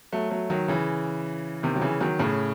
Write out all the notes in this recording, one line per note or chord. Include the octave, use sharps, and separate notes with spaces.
F#3 A3
F#3 A3
D#3 F#3
C#3 E3
C3 D#3
F#3
C#3 E3
D#3 F#3
A2 C#3